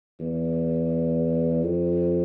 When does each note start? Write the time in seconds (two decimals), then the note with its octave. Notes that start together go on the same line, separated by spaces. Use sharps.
0.20 E2
1.63 F2